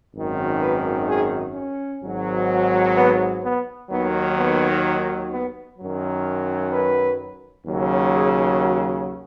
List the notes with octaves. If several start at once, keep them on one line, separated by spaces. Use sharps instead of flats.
G#1 F#2 D#3
B4
G#4
C#4
G#1 G#2 F#3
B3
B3
D#2 D#3 F#3 B3
B3
B3
F#2 D#3 F#3
B4
D#2 C#3 F#3
G#4
F#4